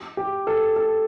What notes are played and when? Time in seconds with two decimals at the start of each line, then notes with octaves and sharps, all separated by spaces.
0.17 G4
0.47 A4
0.76 A4